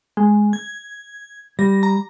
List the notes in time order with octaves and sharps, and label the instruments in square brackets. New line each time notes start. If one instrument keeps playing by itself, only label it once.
[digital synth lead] G#3
G#6
[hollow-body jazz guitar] G3 [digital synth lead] A#6
[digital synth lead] A#5